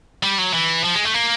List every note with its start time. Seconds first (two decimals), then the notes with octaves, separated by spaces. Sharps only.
0.23 G3
0.38 F#3
0.54 E3
0.84 F3
0.95 G#3
1.05 A3
1.14 A#3